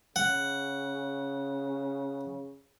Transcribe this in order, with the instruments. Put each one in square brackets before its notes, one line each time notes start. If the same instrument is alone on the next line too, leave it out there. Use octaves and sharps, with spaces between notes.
[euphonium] C#3 [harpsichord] F#5